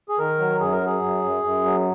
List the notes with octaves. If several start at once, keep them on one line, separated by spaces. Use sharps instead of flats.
G#4
D#3 A#4
F#3
F#2 G#4
A#4
F#3 G#4
F#2
F#2
F#2
F#3